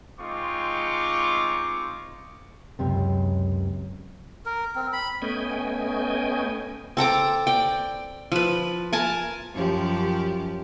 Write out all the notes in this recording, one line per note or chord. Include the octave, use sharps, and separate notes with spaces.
G#3 C4 D#4 F4 C#6 D6
C#2 F#2 C3
A#4
C4
B5
A3 B3 C#4 D#5 G5 G#5
C4 A4 A#5 D6
D5 G5
F3 B4
A#4 G#5 A5
F#2 F3 G4